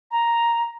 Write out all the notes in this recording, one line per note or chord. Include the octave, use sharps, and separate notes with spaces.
A#5